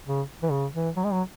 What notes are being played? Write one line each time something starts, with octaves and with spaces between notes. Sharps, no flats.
C#3
E3
C#3
E3
F#3
G#3
F#3